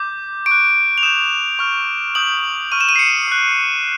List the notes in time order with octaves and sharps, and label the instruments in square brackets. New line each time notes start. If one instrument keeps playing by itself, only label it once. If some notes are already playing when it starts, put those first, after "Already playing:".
Already playing: [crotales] D6 G6
C#6 D7
F#6
F7
D#6 G6 E7
C#6 F6
D#6 G6 F#7
C#6 F6 D#7
E7
D#7
C7
C#7
D#6 F#6